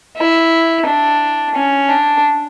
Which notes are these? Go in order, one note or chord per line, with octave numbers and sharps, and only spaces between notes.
E4
D4
C#4
D4